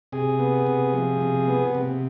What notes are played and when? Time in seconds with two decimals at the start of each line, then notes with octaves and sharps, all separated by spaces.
0.12 C3 G#4
0.39 B3
0.67 C3
0.94 F3
1.21 C3
1.47 B3
1.75 C3